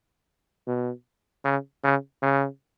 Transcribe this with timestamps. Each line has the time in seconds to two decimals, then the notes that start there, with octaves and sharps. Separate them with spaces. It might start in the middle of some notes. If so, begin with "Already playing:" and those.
0.67 B2
1.45 C#3
1.84 C#3
2.22 C#3